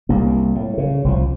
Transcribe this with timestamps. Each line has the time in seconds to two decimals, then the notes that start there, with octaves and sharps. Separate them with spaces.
0.09 C2 A#3
0.55 A2
0.78 C#3
1.04 C2 E3 F3